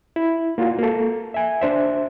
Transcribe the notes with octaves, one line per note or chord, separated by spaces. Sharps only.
E4
A#3 F4 F#4 F5
A#3 A4
E5 G#5
D4 C5 E5